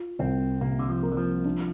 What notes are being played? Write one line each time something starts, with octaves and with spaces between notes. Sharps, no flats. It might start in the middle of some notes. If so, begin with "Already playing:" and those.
Already playing: F4
C2 C4
C3 A#3
D3
F3
A#3
D3
F3
D4